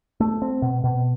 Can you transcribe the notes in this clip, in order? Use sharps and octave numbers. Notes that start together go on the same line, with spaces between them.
A3
C4
B2
B2